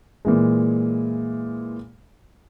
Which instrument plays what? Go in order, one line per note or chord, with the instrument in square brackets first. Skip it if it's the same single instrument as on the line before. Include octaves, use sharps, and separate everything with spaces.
[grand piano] A#2 E3 G#3